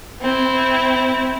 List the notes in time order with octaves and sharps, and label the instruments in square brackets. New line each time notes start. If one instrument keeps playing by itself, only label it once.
[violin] C4 E4